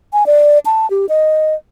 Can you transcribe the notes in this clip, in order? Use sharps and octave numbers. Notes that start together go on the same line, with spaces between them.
G#5
D5
A5
G4
D#5